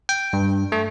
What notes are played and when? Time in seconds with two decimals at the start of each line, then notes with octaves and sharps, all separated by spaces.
0.09 G5
0.33 G2
0.72 A3